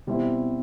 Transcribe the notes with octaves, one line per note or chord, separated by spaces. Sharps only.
B2 G3 C4 E4